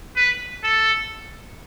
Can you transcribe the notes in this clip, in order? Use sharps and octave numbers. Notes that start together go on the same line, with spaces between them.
B4
A4